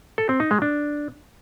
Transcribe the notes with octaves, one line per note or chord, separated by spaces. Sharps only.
A4
C4
D#4
G#3
D4